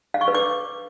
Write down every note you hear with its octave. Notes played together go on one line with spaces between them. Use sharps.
F5
C#6
B4
D6